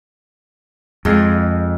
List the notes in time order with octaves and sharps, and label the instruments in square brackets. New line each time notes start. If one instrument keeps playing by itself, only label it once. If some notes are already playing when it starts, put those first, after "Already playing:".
[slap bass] F2 [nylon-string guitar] G#3